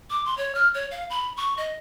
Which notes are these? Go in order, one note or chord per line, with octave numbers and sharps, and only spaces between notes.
D6
C6
C#5
F6
C#5
F5
B5
C#6
D#5